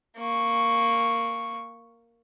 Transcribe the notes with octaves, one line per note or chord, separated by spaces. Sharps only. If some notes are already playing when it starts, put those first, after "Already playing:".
A#3 C#6